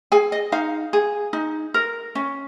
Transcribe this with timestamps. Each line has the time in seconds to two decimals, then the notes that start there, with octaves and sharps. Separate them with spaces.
0.12 G#4 G#5
0.32 D#5
0.52 D#4 F5
0.93 G#4
1.33 D#4
1.74 A#4
2.15 C#4